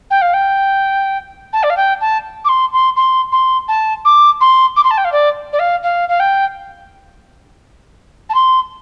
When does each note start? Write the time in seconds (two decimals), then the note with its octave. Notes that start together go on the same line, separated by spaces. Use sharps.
0.11 G5
0.22 F5
0.34 G5
1.53 A5
1.63 D5
1.70 F5
1.77 G5
2.01 A5
2.45 D6
2.49 C6
2.73 C6
2.96 C6
3.32 C6
3.68 A5
4.05 D6
4.41 C6
4.76 D6
4.84 C6
4.91 A5
4.98 G5
5.05 F5
5.12 D5
5.53 D5
5.59 F5
5.83 F5
6.09 F5
6.20 G5
8.30 A5
8.35 C6